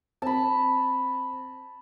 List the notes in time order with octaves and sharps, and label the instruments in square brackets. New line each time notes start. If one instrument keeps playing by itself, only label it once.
[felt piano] C4 [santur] A5 B5